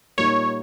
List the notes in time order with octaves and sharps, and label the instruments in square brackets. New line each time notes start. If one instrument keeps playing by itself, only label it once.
[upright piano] A#2 G3 A#3 D#4 A#4 [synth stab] C#5